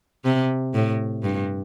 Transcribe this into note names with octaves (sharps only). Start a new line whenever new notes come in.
C3
A2
G2